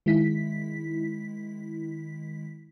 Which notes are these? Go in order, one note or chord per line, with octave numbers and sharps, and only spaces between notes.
D#3 G#3 E4 B6